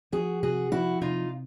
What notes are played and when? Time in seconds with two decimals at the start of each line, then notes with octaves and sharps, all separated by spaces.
0.12 F3 F#4 G#4
0.43 C3 F#4 G#4
0.72 F3 E4 F#4
1.01 C3 D#4 F4